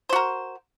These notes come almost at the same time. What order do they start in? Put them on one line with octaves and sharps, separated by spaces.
C5 F#4 A#4